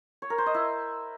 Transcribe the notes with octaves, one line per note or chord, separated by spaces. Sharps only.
C#5
A#4
C5
D#5
E4